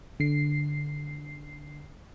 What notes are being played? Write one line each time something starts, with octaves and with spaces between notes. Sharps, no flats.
D3 C7